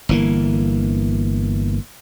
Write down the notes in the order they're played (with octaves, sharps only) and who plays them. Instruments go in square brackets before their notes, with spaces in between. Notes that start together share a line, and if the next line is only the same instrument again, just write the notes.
[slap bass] G1 E3 A#3